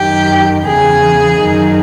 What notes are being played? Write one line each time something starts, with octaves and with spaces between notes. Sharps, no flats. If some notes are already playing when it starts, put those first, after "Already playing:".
Already playing: F#2 D#3 F#3 G4
E2 C#3 E3 G#4
F#2 D#3 F#3